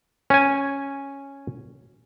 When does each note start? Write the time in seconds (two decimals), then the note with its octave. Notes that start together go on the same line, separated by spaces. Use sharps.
0.30 C#4 G#5